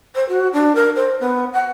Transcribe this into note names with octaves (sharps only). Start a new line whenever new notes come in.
C5
F#4
D4
A#4
C5
B3
F#5